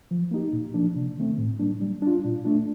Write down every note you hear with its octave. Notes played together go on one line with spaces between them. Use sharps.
F3
A#3 D#4 G4
A#2
F3 A#3 D4
C3
D#3 A3 C4
A2
G3 A#3 D4
G3
D4 F4
A#2
A3 D4